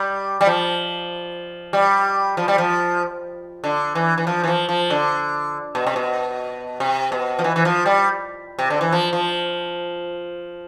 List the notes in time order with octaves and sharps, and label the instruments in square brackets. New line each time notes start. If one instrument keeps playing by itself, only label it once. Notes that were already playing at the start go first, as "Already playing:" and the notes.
Already playing: [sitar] G3
G3
F3
G3
F3
G3
F3
D3
E3
E3
F3
E3
F3
F3
D3
B2
C3
B2
C3
B2
F3
E3
E3
F3
G3
C3
D3
E3
F3
F3